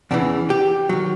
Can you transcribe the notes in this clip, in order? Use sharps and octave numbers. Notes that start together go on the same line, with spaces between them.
E2 C#3 E3 D4
G4
D#3 F#3